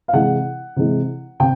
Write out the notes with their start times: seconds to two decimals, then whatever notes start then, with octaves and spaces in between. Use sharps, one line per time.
0.08 F5
0.13 C3 E3 G#3 F#5
0.76 C3 E3 G#3
1.40 C3 G5